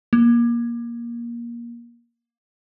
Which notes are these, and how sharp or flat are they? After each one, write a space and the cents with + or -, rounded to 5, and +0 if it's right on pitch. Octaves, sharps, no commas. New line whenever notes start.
A#3 +20